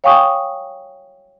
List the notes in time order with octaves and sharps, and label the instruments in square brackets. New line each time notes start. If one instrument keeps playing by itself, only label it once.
[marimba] C#5 F5 G5 G#5 C#6 D#6